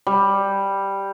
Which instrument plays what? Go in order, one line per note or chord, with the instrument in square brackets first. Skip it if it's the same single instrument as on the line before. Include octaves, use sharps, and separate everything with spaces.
[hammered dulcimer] G3